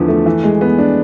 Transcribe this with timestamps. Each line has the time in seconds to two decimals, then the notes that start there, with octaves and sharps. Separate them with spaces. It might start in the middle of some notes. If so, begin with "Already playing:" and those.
Already playing: E2 D3 F3
0.08 A3
0.26 E3
0.44 G#3
0.61 B3
0.79 D4